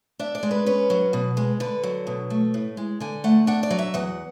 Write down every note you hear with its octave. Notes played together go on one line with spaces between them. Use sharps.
D4 E5
D5
G#3
B4
C#4 B4
F#3
B2
G#3
D3 B4
F#3
B2
A3
A2
G#3
D3 G#5
A3 F#5
D4 F#5
D5
F#3
E5
E2 F#5